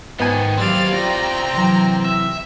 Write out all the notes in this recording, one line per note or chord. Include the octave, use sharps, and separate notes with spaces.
G#2 D#3 B3 G#5
D#2 F#3 C4 C#4 G4 D5 F5 A6
F4 G5 A#5
C3 E3 F#3
E5